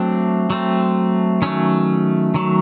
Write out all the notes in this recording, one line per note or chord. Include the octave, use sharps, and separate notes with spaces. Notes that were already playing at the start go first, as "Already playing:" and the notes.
Already playing: F#3 A3 C4 D4
F#3 A3 C4
D#3 F#3 A3 C#4
D#3 F#3 A3